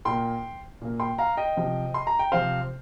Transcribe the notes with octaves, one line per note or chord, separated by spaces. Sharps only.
A#2 A#3 G5 C6
A#2 A#3
G5 C6
F5 A#5
D#5 G5
C3 F3 C4
C6
A#5
G5
C3 F3 C4 C5 F5